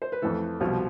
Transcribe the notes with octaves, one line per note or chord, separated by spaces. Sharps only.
C5
B4
F2 E3 A3 A4
C2 B2 F3 F4